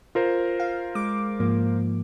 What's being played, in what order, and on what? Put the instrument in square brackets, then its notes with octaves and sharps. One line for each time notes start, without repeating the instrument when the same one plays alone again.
[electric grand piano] F4 A#4 C5
[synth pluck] F5
G#3 D6
G#2 F3 A#3